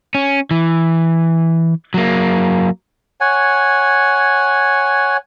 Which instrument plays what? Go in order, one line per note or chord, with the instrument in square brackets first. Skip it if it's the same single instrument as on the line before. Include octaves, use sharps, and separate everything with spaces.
[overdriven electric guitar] C#4
E3
F#3 A#3
[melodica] C#5 F#5 G#5